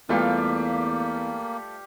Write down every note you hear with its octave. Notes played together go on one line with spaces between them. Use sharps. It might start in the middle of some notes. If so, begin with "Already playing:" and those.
E2 G3 A3 A#3 F4 G4 B4 F5